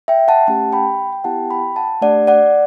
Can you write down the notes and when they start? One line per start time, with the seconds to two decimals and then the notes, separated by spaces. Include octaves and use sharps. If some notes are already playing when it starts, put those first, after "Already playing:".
0.08 E5 G5
0.28 F#5 A5
0.47 A3 C#4 G4 F#5 A5
0.73 G5 B5
1.12 G5
1.24 B3 E4 G4 F#5 A5
1.51 G5 B5
1.76 F#5 A5
2.01 A3 D4 G4 D5 F#5
2.27 D5 F#5